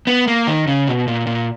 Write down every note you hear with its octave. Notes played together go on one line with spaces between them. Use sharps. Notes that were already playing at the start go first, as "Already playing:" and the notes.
B3
A#3
D#3
C#3
B2
A#2
A#2